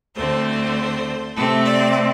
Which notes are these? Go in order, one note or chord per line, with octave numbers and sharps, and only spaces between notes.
D2 D3 A3 C4 C5
C3 A3 C4 A4
D5